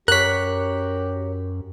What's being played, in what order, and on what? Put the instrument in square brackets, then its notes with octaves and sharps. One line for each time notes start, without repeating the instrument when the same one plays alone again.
[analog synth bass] F#2 [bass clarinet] G4 [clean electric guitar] A#4 C#5 [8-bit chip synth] F#6 B6